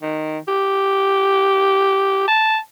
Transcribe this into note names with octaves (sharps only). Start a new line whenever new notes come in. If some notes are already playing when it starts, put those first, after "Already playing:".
D#3
G4
A5